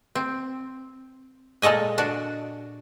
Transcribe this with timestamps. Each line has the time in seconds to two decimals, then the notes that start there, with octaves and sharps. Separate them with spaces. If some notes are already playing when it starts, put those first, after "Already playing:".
0.15 C4
1.62 A#2 G#3 A4 D#5 G#5
1.98 D4 F#4